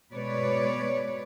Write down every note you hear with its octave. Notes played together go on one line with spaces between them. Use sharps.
B2 G#3 B4 C#5 D5